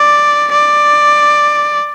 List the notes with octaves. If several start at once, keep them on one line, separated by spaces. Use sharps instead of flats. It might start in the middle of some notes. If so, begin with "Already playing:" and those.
Already playing: D5
D5